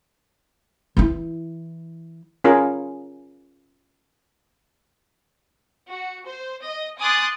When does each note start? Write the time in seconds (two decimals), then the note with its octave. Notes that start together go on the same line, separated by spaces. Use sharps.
0.97 E3 E4
2.44 C#4 F4 G#4 A#4
5.89 F#4
6.26 C5
6.64 D#5
6.98 G#5 C6 D6 D#6 F#6 A6